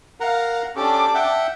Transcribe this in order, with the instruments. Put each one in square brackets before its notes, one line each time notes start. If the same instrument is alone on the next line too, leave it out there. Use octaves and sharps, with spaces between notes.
[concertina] A#4 F#5 A#5 [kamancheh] F5
[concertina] C#4 G4 A4 [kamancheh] D4 D6
[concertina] E5 F#5 G5